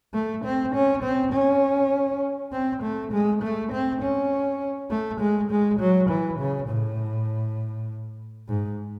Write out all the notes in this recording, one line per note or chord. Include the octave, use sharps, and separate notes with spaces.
A3
C4
C#4
C4
C#4
C4
A3
G#3
A3
C4
C#4
A3
G#3
G#3
F#3
E3
C#3
A2
G#2